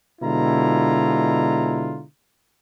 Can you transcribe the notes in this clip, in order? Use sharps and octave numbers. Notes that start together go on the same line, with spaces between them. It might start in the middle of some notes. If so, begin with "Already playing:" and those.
B2 D3 G#3 E4 F4 A#5